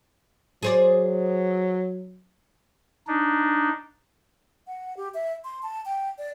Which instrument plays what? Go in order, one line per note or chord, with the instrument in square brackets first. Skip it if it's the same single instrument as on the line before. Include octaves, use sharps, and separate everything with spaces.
[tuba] F#3 [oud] G#4 C5 D5
[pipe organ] D4 D#4
[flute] F#5
G4
E5
C6
A5
G5
D5